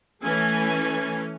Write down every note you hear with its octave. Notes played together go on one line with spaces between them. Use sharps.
E3 A3 C#4 G#5